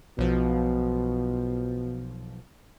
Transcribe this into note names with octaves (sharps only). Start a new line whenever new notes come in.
B1 B2 F3